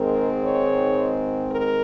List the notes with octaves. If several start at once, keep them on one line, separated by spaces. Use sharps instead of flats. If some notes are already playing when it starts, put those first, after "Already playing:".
Already playing: G#2 D#3 G#3 C4 A#4
C#5
A#4